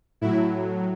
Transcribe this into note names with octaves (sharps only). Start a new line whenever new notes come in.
A2 F#3 E4